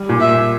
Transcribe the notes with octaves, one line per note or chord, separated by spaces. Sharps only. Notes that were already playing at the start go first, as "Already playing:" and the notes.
Already playing: G3
A#2
E5
A#2